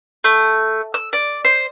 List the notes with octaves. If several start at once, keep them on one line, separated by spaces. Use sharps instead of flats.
A3
E6
D5
C5